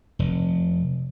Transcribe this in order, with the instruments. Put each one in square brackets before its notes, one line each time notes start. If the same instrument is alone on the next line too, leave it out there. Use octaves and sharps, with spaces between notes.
[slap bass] F1